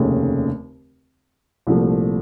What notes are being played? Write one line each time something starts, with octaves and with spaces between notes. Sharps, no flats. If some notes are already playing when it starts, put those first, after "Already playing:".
Already playing: F1 D#2 C#3 A3
C2 A#2 F3 A3